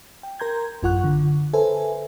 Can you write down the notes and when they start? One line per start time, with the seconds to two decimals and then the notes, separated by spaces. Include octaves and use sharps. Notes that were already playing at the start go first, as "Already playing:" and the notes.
0.23 G5
0.40 A#4 A#5 C6 G6 G#6
0.83 A1 F#2 F4 F#5 C#6 F#6
1.04 D3
1.53 A4 B4 C5 E5 G#5